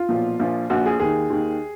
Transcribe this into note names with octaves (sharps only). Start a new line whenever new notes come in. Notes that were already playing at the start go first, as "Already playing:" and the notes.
Already playing: F4
B1 A#2 F3
A#1 A#2 F3
A#1 A#2 F3 F#4
G#4
D#2 D#3 G#4
D#2 D#3